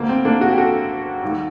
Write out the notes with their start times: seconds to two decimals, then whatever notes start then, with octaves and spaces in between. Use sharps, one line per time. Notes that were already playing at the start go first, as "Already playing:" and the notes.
Already playing: D2 D3 A3 A#3
0.09 C4
0.25 A#3 D4
0.41 D4 F#4
0.51 G4
0.58 F#4 A4
1.22 D#2 D#3 G3